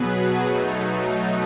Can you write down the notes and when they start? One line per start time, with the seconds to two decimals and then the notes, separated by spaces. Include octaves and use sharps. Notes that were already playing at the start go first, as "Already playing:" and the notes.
Already playing: B2 F#3 B3 G#4 B4
0.14 F#4
0.42 B2 F#3 A3 D#4
0.99 D#4